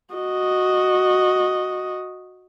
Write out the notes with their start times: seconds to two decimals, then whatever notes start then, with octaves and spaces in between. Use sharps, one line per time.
0.15 F#4 D#5